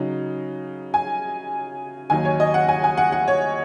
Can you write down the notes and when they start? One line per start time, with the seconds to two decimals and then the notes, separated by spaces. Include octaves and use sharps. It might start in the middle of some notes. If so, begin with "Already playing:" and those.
Already playing: C#3 F#3 D#4
0.94 G#5
2.10 D#2 D#3 F#3 D#4 G#5
2.25 C#5
2.40 D#5
2.54 F#5
2.69 G#5
2.84 G#5
2.97 F#5
3.12 F#5
3.28 C#5